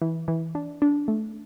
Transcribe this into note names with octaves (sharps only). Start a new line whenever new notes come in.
E3
E3
D4
D4
A3